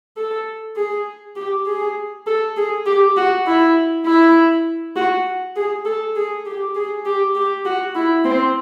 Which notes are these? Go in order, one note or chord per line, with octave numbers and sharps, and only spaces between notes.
A4
G#4
G4
G#4
A4
G#4
G4
F#4
E4
E4
F#4
G#4
A4
G#4
G4
G#4
G4
G4
F#4
E4
C4